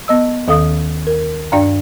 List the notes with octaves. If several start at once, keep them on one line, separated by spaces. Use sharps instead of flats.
B3 D#5 E6
D#2 D#3 A4 F5 D#6
A#4
G2 D4 D5 F5 A#5